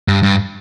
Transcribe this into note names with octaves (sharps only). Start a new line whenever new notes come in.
G2
G2